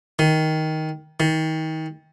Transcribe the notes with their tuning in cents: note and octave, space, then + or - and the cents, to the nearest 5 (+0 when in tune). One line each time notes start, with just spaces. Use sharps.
D#3 +10
D#3 +30